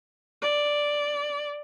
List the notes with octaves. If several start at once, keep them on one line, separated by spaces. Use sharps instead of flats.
D5